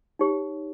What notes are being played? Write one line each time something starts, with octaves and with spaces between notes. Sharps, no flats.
D#4 G4 C#5